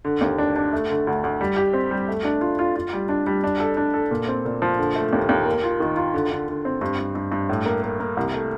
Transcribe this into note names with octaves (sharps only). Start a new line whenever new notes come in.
D3
D#2
D4
D4
A3
D3
D2
D2
G3
G4
C4
G3
A3
D4
F4
F4
F4
G3
D4
G3
D4
A4
D4
A4
A#2
C4
A#2
F3
D3
A3
D#2
D#2
A#3
F4
D#3
F4
D3
D3
D3
C4
G2
G2
G2
G2
A2
A#3
A#3
A#3
C2
A3